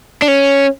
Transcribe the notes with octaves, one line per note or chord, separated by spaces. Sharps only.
D4
C#4